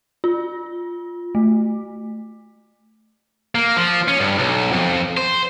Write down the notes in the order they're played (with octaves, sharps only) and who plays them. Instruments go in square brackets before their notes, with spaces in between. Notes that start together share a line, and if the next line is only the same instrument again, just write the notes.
[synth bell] F4
A3
[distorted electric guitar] A#3
F3
C#4
G2
B1
F2
C5